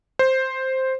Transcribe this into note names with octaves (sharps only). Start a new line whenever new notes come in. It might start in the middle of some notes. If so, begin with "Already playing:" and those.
C5